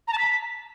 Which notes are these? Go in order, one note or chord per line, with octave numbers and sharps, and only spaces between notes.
A#5
A5
B6